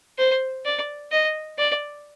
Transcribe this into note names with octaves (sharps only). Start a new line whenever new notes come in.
C5
D5
D#5
D5